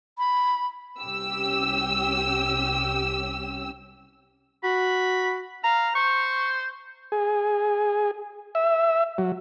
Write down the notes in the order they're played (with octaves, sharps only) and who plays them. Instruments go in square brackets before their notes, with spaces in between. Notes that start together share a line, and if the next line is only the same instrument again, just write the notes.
[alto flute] B5
[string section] C2 C#4 G4 E6
[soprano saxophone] F#4 [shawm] B5
[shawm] F5 [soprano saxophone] A#5
[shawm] C5 [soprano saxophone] C#6
[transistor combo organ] G#4
E5
F#3